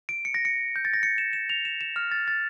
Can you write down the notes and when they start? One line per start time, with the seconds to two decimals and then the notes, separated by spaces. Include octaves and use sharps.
0.09 D7
0.25 C#7
0.34 A#6
0.45 C#7
0.76 G6
0.85 A6
0.94 A#6
1.03 C#7
1.18 E7
1.33 E7
1.49 F7
1.65 E7
1.81 E7
1.96 F6
2.12 A6
2.28 A6